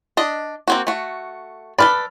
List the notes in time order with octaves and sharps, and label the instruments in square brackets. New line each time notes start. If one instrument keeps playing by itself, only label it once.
[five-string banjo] D4 D#5
A#3 C4 F#4
A3 F#4
[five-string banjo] A4 B4 D5 [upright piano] B5 F6